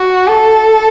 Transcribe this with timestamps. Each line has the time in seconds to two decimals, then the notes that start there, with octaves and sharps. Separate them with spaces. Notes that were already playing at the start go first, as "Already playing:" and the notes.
Already playing: F#4
0.27 A4